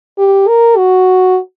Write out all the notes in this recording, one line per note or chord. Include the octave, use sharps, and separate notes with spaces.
G4
A#4
F#4